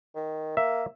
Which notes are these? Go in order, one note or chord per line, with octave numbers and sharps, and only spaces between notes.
D#3
A#3 E5